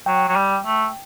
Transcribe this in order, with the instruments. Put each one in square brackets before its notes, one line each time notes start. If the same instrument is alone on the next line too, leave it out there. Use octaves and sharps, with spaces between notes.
[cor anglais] F#3 [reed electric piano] G5
[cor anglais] F#3
G3
A3